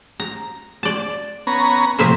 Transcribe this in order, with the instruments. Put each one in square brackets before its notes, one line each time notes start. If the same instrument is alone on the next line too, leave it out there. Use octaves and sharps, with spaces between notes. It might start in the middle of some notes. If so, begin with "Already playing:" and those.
[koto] A#5
D5 A5
[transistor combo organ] B3 C#4 A#5
[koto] A2 F3 E5 [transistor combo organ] C3 A#3